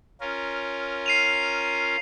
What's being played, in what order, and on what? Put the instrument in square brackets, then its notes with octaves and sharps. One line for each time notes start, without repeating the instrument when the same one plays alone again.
[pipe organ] C#4 F4 A#4
[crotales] C7 D#7 F7